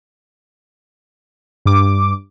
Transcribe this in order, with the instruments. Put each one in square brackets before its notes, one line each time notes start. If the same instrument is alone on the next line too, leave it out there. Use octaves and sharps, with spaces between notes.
[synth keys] G2 D6